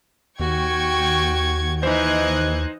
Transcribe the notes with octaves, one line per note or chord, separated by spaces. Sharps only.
D#2 F#4 G5 C#6 G#6
E3 D#4 C5 D#5 F#6 G#6